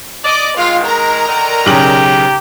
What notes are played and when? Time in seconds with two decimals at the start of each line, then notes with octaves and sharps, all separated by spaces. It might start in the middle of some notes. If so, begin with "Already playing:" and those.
0.25 D5 D#5 D6
0.57 D#3 G#3 F4 F5
0.87 A#4 A#5
1.27 D3 D#3
1.66 B1 C#3 G4 F#7